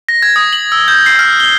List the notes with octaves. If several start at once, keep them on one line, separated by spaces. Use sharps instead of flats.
A#6
G#6
D#6
F#7
E6
G6
C7
F6
G7